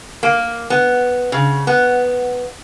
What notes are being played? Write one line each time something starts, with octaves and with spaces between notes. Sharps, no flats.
A#3
B3
C#3
B3